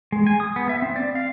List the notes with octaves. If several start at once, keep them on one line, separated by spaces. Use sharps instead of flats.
G#3
G#5
D#6
B3
E5
C4
D5
F5